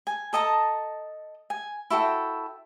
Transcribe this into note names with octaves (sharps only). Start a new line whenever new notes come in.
G#5
A4 D#5 A5 A#5
G#5
E4 F#4 A4 G5